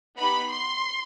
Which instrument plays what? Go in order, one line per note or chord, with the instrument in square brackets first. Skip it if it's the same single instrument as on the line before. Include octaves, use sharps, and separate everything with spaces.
[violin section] B3 D#4 G4 B5
C6